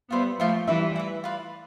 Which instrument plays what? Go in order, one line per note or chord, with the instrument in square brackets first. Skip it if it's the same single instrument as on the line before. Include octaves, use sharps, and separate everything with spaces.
[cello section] G3 B3 [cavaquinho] F4 C5 E5 B5
[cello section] F3 A3 [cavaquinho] F4 C5 E5 B5
[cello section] E3 G3 [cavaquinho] E4 B4 E5
[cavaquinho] E4 B4 E5
F4 B4 D5